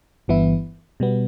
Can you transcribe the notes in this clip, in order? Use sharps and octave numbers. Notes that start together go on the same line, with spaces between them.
G1 G2 E3 B3 E4
B2 G3 B3